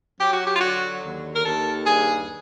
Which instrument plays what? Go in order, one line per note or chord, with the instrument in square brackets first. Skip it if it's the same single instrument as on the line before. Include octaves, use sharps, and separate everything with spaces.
[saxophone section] F#3 G4
F#4
G4
F4
D3 F#4
D#2
A#4
D#2 A4
G2 G#4